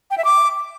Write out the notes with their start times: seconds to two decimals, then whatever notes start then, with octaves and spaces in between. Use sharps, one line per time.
0.11 G5
0.18 E5
0.25 D6